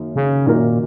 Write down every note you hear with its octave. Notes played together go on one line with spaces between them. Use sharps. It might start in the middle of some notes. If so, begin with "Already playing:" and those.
Already playing: F#2 D#3 A#3
C#3
F#2 A#2 D#3 A#3 D#4 A#4